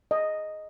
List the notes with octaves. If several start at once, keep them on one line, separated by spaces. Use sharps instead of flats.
D#5